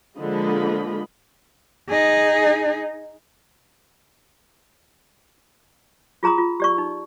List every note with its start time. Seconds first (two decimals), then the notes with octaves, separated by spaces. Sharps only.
0.18 D3 F3 G#3 A#3 D#5 B5
1.90 D#4 G#4
6.23 F4 G#4 A#5 C6 D#6
6.38 F4
6.60 G4 D5 C#6
6.78 D#4